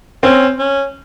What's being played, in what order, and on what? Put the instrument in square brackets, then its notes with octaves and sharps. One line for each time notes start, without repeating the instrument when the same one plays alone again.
[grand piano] C4 [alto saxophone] C#4
[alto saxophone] C#4